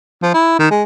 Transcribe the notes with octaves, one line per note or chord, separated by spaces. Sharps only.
F3
E4
D#3
G#3